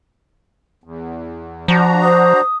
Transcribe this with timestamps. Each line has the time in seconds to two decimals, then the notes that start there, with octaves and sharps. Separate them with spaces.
0.84 E2
1.68 F3 D4 F#4 A#5
2.02 C5 D#6